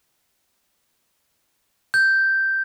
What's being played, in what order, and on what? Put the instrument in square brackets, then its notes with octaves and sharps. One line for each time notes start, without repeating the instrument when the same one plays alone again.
[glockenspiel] G6